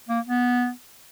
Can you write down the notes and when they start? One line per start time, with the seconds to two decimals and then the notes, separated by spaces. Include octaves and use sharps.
0.09 A#3
0.26 B3